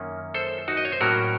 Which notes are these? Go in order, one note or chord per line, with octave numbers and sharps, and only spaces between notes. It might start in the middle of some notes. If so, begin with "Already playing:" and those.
Already playing: F#2 D#3 A#3 C#4
A4 C5
D#4 F#4
D#5
C#5
C5
A2 F#3 A#3 C#4 F#4 A#4